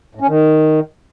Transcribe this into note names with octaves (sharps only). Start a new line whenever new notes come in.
A2
C#4
D#3